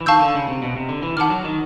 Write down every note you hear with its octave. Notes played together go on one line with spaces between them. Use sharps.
E3
D#3 F5 A5 C#6 E6 G6
D3
C#3
C3
B2
C3
D3
E3
D#3 F#5 A5 D6 F6
F#3
D#3